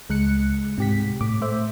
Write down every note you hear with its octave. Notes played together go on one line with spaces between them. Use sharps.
C#2 G#3 F#6 C#7
G#2 C3 G4 B6
A2 D6
A3 C5 E5